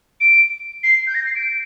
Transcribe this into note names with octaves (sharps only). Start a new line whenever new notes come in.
D7
C7
G6
A#6
C7
D7